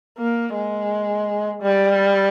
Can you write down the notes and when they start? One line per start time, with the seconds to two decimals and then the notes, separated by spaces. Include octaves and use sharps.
0.18 A#3
0.54 G#3
1.63 G3